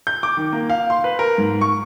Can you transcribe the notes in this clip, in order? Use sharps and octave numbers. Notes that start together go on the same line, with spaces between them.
G6
D6
D#3
A#3
F5
C6
B4
A#4
G#2
C#6